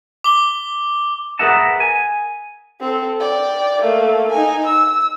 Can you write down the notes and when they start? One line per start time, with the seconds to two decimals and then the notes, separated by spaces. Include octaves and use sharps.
0.24 D6 G7
1.39 G#4 A#4 B4 E5 F#5 A5
1.80 G#5
2.80 C4 A4
3.20 D5 G5
3.81 A3 A#3
4.31 D#4 G#5
4.66 E6